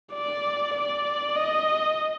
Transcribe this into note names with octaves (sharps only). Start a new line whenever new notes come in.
D5
D5
D#5